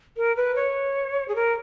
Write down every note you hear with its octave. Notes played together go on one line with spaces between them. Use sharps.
A#4
B4
C#5
G#4
A#4